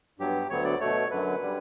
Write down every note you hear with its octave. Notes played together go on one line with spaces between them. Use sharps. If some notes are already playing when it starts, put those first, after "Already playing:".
G2 F#3 B3 G4
D2 D3 F#3 B3 C#5
D5
B2 A3 C#5
F#2 D3 F#3 B4
D3 G3